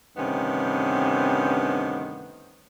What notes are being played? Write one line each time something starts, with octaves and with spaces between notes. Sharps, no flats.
D2 G2 C3 D#3 B3 C#4